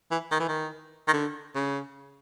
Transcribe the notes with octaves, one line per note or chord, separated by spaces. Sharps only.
E3
D#3
E3
D#3
D#3
D3
C#3